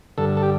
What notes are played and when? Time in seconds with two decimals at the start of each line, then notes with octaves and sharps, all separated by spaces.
0.18 G2 D3 A4
0.37 A4
0.43 G4